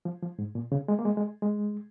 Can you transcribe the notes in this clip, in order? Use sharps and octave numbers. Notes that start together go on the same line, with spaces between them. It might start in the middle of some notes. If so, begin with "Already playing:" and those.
F3
F3
G#2
A#2
C#3
G#3
A#3
G#3
G#3
G#3